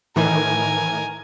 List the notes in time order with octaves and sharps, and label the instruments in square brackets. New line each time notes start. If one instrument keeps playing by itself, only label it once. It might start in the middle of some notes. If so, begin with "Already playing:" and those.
[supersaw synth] A2 D#3 E3 [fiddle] A#4 G#5